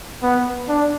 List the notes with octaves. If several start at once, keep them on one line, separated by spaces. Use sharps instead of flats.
B3
D4